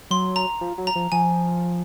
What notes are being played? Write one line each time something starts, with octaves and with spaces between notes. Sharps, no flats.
F#3 C6
A#5
F3
F#3
A#5
F3
F3 G#5